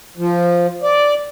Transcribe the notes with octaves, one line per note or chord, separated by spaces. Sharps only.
F3
D5